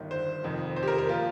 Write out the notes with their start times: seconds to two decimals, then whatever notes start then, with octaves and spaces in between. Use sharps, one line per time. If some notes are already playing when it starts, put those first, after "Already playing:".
Already playing: G1 G2 D#3
0.11 C5
0.43 F1 F2 D#3
0.76 C5
0.83 G4
0.88 A#4
0.98 A#4
1.09 A#2 F3 F4